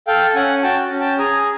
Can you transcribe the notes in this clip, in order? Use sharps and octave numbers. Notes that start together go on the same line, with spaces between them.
A4 F5 G5
C#4 F#5 G#5
F#4 G5 A5
C#4
G5 A5
G#4 G#5 A#5